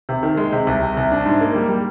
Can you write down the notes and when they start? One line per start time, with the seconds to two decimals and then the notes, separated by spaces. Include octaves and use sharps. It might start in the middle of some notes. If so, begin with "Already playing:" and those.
0.09 C3
0.23 D#3
0.37 G#3
0.52 C3
0.67 C2
0.82 C3
0.97 C2
1.12 D4
1.25 G#2
1.41 A#3
1.55 G3
1.69 G3